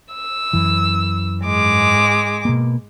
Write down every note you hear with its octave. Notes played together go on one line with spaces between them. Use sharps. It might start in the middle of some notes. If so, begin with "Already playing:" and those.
E6
F#2 E3
G#2 G#3 D6
B2 A#3